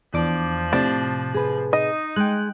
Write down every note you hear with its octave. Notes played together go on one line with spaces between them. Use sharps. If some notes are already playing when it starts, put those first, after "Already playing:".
E2 F3 D4 D6
A2 C3 D4
G#4 B4
D#4 D#5
G#3 G5 F#6